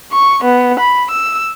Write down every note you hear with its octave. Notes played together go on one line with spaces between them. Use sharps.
C#6
B3
B5
E6